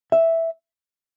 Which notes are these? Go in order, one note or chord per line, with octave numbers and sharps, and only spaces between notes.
E5